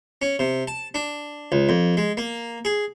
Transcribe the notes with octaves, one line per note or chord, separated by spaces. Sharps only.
C#4
C3
A5
D4
C#2
F2
G#3
A#3
G#4